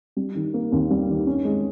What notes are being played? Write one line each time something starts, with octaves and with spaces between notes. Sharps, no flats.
G3
D#3
A#3
D#2
G3
D#3
C#4
G#3